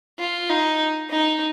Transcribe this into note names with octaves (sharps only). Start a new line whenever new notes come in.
F4
D#4
D#4